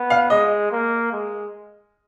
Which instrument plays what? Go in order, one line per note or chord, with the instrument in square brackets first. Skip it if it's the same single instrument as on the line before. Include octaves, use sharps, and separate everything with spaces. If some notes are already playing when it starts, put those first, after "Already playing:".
Already playing: [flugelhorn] B3
[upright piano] F5
[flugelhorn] G#3 [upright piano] D#5
[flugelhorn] A#3
G#3